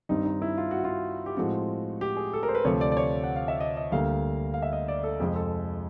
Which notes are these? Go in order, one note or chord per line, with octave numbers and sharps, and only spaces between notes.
G2 D#3 G3 C4 D#4
D#4
E4
F4
F#4
F4
G4
A2 F3 G#3 C4 F#4
G4
G#4
A4
A#4
C5
B4
D2 C3 F3 A3 C#5
D5
D5
C#5
F#5
F5
E5
D#5
D#5
D2 D3 G3 A#3 F5
F5
E5
D#5
D5
A4
F2 C3 F3 G#3 G#4
A4